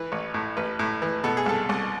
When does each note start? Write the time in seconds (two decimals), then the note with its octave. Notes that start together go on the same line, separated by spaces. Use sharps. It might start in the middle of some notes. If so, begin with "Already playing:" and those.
Already playing: E3 B4
0.12 A1
0.34 A2
0.57 A1 B4
0.79 A2
1.02 E3
1.24 B2 A4
1.37 G#4
1.46 C2 A4
1.69 C2